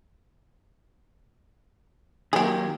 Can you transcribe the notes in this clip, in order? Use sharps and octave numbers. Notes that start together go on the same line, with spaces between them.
D#3 F#3 A#3 G4 G#4